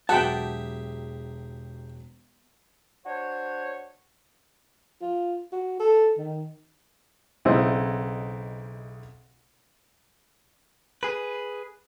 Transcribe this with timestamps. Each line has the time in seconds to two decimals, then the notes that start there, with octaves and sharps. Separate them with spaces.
0.09 E1 F#3 G4 G#4 E5 F#5 G5 A5
3.06 D4 F#4 C5 C#5
5.02 F4
5.52 F#4
5.80 A4
6.18 D#3
7.45 B1 C#3 C4 E4 C5 D#5
11.03 G#4 B4